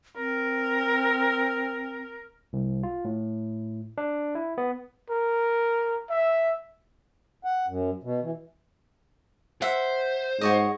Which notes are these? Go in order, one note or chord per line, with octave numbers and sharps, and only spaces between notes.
C4 A#4
C2
F4
A2
D4
E4
B3
A#4
E5
F#5
F#2
B2
E3
C5 E5 F#5
G#2 F#4 C#5 D#5